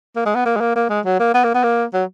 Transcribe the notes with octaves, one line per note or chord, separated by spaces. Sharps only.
A#3
G#3
B3
A#3
G#3
A#3
A#3
G#3
F#3
A#3
B3
A#3
B3
A#3
F#3